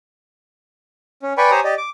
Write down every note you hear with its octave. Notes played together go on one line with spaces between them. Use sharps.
C#4
B4 D5 G5 G#5 B5 C#6
G4 C5 C#5 G#5 A#5 D#6
G4 D5 D#5
D6